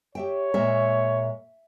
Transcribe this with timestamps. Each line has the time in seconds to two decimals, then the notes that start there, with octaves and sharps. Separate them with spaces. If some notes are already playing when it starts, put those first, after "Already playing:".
0.15 G4 C#5 E5 G5
0.54 A#2 G#3 A#3 E5